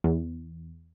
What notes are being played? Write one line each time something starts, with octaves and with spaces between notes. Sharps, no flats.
E2